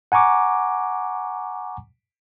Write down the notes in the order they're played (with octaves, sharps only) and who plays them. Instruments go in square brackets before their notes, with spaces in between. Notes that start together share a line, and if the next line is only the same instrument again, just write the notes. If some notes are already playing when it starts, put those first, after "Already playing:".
[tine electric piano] F#5 G#5 A#5 C#6 D6